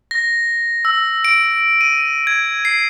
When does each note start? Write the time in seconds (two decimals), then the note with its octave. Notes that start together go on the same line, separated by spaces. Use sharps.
0.11 A#6
0.85 E6
1.25 D7
1.81 D#7
2.27 G#6
2.65 C7